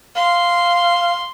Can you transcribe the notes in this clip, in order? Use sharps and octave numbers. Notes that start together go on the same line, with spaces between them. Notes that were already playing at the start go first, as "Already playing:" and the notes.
F5 C6